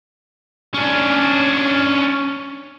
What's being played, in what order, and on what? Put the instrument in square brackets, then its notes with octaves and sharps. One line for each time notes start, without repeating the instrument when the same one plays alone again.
[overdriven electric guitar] C#4 D4